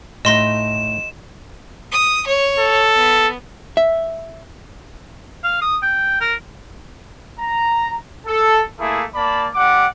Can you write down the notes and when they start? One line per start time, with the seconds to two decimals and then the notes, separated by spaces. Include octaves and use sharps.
0.25 A2 A3 D#4 D#5 C6 A#6 E7
1.92 D#6
2.27 C#5
2.60 A4
2.96 B3
3.77 E5
5.44 F5
5.62 D#6
5.83 G5
6.21 A#4
7.39 A#5
8.26 A4
8.79 A3 A#3 E4 G#4
9.15 A#3 D5 A5 B5
9.55 G3 F#5 D6